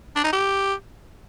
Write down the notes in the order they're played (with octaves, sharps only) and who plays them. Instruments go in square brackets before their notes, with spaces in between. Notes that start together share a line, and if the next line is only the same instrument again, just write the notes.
[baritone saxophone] D4
D#4
G4